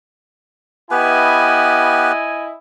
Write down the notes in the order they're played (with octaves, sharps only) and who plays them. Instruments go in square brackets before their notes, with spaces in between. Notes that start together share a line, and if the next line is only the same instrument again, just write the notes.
[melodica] B3 G4 B4 [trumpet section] E4 D#5 G#5